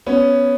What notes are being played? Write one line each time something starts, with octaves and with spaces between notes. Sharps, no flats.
B3 C#4